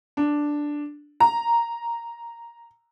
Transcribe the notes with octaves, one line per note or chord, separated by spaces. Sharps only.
D4
A#5